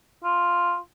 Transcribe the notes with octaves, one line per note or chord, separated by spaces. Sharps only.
F4